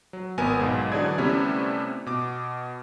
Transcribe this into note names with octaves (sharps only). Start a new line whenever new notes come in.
F#3
G#1 B3 A#4 G#5
B1 G#2 B2
D3 E3 F#3 G#4 D5 G#6
C3 G3 A3 B3 C#4 E4
B2 D6